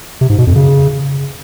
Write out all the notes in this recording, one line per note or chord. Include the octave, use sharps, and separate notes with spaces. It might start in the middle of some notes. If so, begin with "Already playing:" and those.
C3
G#2
B2
F2
C#3